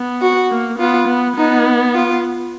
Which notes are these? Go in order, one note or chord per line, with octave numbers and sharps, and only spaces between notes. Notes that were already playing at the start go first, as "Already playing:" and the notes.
Already playing: B3
F#4
A#3
B3 F4
B3
B3 D#4
F4